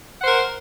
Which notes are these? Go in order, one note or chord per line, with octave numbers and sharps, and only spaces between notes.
A#4 C5 F#5